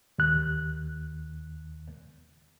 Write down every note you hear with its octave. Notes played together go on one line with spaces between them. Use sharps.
D#2 F#6